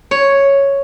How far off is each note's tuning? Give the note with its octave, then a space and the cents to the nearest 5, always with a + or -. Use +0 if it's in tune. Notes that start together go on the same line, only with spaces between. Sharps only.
C#5 +0